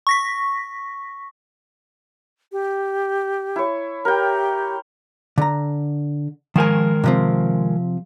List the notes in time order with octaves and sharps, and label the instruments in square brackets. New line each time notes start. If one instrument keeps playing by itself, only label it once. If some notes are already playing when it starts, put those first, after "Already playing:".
[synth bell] C#6 A#6 B6
[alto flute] G4
[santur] E4 C#5
[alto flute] G4 [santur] A#4 G5
[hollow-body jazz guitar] D3 A#5
[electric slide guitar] D#3 G#3 A#4 [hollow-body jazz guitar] F3 G5 G#5
[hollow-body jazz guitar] C3 F3 C4